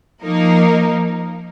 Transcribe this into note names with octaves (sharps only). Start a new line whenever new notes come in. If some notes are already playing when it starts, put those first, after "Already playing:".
F3 A#3 D#4 A#4